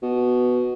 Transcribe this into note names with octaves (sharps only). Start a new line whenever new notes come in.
B2